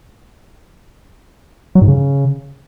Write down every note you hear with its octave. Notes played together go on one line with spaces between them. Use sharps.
F#3
G#2
C#3